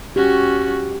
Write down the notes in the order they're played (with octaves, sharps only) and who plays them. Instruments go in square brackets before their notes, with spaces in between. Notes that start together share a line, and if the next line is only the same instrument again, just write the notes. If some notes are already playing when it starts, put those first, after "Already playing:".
[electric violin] C#4 F#4 [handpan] G4